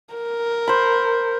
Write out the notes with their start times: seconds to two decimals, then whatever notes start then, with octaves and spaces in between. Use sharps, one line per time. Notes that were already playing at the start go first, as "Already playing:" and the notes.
0.14 A#4
0.68 C5 B5